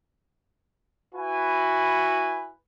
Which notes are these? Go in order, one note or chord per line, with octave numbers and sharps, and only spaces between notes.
E4 F#4 B4 G#5